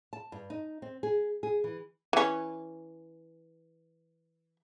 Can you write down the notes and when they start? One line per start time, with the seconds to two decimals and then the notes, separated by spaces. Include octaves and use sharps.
0.13 A5
0.32 G2
0.50 D#4
0.82 C4
1.03 G#4
1.43 G#4
1.64 E3
2.13 E3 C#4